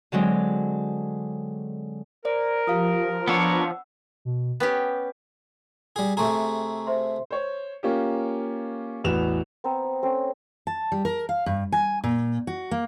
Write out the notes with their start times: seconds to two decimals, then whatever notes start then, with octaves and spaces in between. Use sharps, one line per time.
0.12 D3 F#3 G#3 C4
2.25 A#4 C5 D5
2.67 F3 G4 F5 D#6
3.28 B3 D4 C#5 F#5 E6
4.25 B2
4.60 B3 C#4 G4 G5
5.96 G3 G#4
6.17 C3 A3 G#4 A#5 C6 C#6
6.87 C5 E5 C6
7.31 C5 C#5
7.83 A#3 C#4 F4 G4
9.04 A1 E2 F#4 B4 E7 F7
9.64 B3 C4 C5 A#5
9.85 D#6
10.02 A3 C4 C#4
10.67 A5
10.92 G3
11.05 A#4
11.29 F5
11.46 G2
11.72 G#5
12.04 A#2
12.47 F#4
12.71 A#3